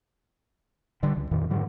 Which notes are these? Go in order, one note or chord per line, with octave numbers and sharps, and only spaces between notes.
D3 G3
C#2
F2 A#2 D#3
G#2 D3 F#3